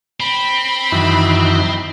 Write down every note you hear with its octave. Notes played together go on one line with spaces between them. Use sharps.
C4 B5
F#2 D#3 E3